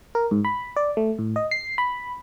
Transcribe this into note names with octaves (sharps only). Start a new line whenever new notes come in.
A#4
G#2
B5
D5
A3
A2
D#5
C7
B5